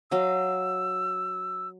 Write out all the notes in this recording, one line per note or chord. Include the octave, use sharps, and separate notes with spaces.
F#3 D#5 F5 E6